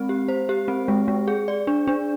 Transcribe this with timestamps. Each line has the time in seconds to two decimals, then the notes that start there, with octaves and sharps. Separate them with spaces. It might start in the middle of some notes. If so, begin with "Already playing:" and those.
Already playing: G#3 C4
0.09 G4
0.28 C5
0.49 G4
0.68 C4
0.88 G#3
1.08 G#3
1.28 G#4
1.48 D5
1.67 D4
1.87 D4